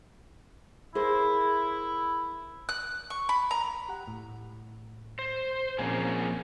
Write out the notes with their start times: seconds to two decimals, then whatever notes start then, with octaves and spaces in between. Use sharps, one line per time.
0.95 E4 G#4 A#4 C5
2.69 F#6
3.10 C#6
3.29 B5
3.51 A#5
3.89 G4 F#5
4.08 A2
5.19 C5
5.79 A#2 F3 A#3 C4 C#4 G#4